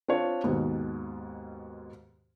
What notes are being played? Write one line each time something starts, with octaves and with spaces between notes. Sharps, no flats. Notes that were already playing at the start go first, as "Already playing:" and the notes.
C4 D4 F4 C#5
D#2 G#2 B2